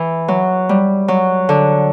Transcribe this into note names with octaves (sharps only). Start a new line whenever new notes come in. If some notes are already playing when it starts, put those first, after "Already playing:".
Already playing: E3
F#3
G3
F#3
D3